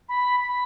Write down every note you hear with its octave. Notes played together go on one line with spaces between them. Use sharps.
B5
B5